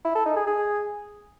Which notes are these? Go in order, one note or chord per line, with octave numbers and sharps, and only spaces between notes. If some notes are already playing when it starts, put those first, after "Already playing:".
E4
A4
D#4
G#4
G#4